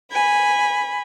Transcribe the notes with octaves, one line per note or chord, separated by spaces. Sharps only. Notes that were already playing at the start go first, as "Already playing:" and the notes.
G#5 B5